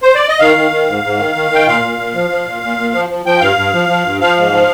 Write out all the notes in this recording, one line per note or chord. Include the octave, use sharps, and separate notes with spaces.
C5
D5
D#5
D#3 F5
D#3
D#3
G#2
G#2
D#3
D#3
D#3 G5
A#2 F5
A#2
A#2
F3
F3
A#2
A#2
A#2
F3
F3
F3 G5
G2 F5
G2
F3
F3
G2
F3 F5
G#2
F3